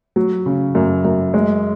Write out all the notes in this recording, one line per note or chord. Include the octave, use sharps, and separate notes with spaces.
F#3
C#3
F#2
F#2
G#3